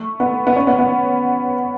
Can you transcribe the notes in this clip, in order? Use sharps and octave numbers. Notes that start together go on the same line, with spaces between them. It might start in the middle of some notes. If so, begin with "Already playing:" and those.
Already playing: A3
B3
B3
C#4
B3
B3